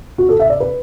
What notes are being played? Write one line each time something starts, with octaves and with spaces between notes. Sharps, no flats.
F#4
A4
E5
D5
B4